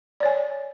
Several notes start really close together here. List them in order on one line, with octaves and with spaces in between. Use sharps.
D5 C#5 G#5